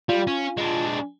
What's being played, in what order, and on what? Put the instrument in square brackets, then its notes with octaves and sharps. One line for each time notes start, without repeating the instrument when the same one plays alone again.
[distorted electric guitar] G3 [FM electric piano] F4
[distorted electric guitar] C#4
G#3 D4